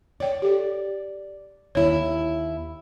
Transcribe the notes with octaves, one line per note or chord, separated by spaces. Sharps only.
C#5 D5 G5
G4 A4
D#2 E4 C#5